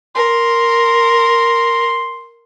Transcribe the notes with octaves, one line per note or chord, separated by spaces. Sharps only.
A#4 C6